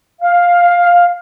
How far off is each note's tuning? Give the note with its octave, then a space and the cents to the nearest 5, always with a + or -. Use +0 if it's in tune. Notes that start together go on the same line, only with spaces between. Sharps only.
F5 +5